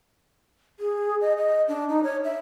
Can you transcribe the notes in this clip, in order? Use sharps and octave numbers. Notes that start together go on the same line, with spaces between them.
G#4
D#5
D#5
D4
D#4
C#5
E5